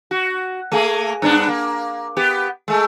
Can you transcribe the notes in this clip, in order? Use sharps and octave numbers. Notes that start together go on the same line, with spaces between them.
F#4
A3 A#3 G#4
G2 B3 D4
A#3
B3 G4
G#3 A3